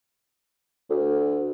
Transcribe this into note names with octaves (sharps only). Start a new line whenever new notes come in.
D2